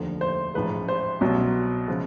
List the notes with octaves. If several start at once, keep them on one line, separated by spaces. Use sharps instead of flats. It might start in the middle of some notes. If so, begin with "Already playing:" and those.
Already playing: F1 D#2 D3 F3
C5
A1 G#2 F3 G#3 B4
C5
C2 B2 F#3
C#3 F3 G#3